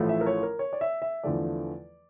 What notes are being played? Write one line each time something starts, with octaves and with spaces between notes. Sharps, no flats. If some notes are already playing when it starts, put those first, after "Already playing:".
Already playing: A1 A2 F3 A3
E5
A#4
C#5
A#4
C#5
D5
E5
E5
E2 D3 F3 A3 D5